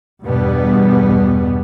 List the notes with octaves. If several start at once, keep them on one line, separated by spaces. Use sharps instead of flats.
E2 G2 B2 G3 B3